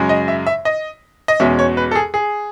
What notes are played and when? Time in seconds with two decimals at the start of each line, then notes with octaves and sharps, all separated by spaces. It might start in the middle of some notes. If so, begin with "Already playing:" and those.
Already playing: F#2 C#3 G#3
0.09 D#5
0.28 E5
0.46 E5
0.65 D#5
1.28 D#5
1.40 E2 B2 G#3 C#4 E5
1.59 C#5
1.77 B4
1.91 A4
1.95 G#4
2.14 G#4